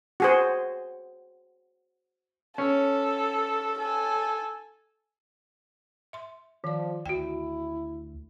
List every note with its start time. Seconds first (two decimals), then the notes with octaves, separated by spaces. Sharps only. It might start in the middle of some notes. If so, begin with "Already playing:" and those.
0.20 F#4 G#4 C5
2.58 C#4 A4
3.79 A4 G#5
6.13 E5 C6
6.64 D#3 F3 D5
7.06 D2 E4 F#4 G5